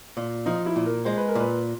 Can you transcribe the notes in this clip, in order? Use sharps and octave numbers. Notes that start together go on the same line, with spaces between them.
A#2
F3 D#4
E4
A#2
A#4
G#3 C5
B4
A#4
A#2 B4